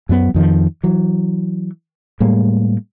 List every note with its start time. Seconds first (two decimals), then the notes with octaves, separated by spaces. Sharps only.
0.09 F#2 F#3 B3
0.34 F2 D#3 F3
0.83 E3 F#3
2.20 A2 G3 G#3 A#3